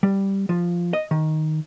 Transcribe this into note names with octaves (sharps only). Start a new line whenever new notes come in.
G3
F3
D#5
D#3